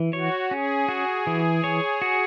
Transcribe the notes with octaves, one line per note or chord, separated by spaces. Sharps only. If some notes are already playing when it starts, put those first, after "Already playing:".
Already playing: E3
F#4 C#5
C#4 G#4
F#4
E3
C#5
F#4